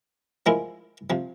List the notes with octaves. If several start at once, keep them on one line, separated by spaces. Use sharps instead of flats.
F3 G#3 E4 A#4
C3 F3